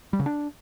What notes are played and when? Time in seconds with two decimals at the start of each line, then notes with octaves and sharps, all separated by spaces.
0.13 G3
0.20 C#3
0.26 D4